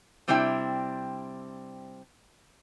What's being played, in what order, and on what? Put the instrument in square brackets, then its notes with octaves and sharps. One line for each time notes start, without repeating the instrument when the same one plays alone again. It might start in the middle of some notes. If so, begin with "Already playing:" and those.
[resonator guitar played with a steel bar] C3 G3 C4 D4 E4 G5